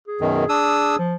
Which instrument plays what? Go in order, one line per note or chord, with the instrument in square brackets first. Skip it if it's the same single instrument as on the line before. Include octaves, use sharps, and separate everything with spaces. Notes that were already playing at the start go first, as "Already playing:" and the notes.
[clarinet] G#4
[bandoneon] F#2 B2 D#3
D4 D#6 E6
[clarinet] F3